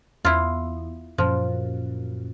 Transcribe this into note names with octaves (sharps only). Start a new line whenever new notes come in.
E2 E4 F4
F#2 A#2 F3